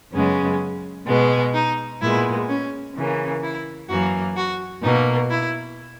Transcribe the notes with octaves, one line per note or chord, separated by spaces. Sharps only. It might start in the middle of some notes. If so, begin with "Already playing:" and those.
F#2 C#3 G#3 B3 C#4
B2 G#3 B3
D#4
A#2 G#3 B3 E4
C#4
C#3 E3 A#3
E4
F#2 E3 A#3 F#4
F#4
B2 A#3 D#4
E4